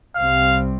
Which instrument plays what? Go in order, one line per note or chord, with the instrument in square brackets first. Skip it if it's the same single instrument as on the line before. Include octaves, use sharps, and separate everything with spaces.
[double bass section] C2 C3 G3 C4 [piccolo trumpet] F5